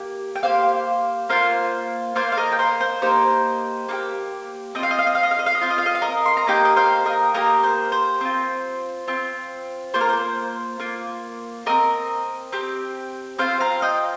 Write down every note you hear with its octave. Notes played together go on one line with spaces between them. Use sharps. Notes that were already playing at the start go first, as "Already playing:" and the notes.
Already playing: A#3 G4
G5
A#3 G4 C5 F5
A#3 F4 C5 F5
A#3 F4 C5 F5
F5
A#4 D#5
G5
C5 F5
C5
A#3 D#4 G4 C5
A#3 D#4 G4
C4 F4 D#5 F5
D#5
F5
D#5
F5
D#5
F5
D#5
F5
D#5
C4 F4 F5
D#5
F5
D#5
F5
A#4 D#5
C6
A#5
A#3 D#4 G4 D#5 G5
D#5
C5 F5
A#4 D#5
A#3 D#4 G4 A#4 D#5
C5
C5
C4 F4
C4 F4
A#3 F4 C5
A#4
C5
A#3 F4
C4 G4 A#4 D#5
C4 G4
C4 F4 C5 F5
F5 A#5
D#5 G5